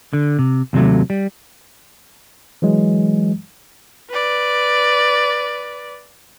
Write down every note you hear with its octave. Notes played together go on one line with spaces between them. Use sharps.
D3
C3
D#2 C3 D#3 F#3 A3
G3
E3 F#3 G#3
B4 D5